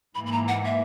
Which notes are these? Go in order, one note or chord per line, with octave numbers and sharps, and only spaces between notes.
G#2 E3 A#3 B5
B5
A#5
F#5
E5